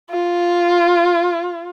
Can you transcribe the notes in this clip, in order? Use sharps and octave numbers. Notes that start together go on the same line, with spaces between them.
F4